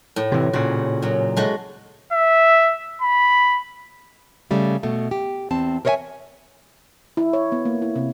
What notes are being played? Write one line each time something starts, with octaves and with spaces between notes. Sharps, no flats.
A2
C3 E3
A#2 C#3 F#4
F#2 F#3
G#3 A3 F#4
E5
B5
C#3 G3 A3
B2 A3
G4
E2 C4 A5
A#4 C5 C#5 D#5 E5 G#5
E4
C#5
B3
A#3
E4
C3